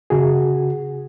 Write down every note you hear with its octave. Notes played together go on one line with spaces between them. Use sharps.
C#3 F#4 G#4